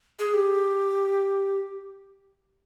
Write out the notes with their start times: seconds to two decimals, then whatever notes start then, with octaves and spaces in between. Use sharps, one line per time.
0.19 G#4
0.34 G4